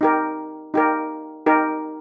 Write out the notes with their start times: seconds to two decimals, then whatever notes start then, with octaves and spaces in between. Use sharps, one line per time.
0.01 D#4 G4 A#4
0.74 D#4 G4 A#4
1.46 D#4 G4 A#4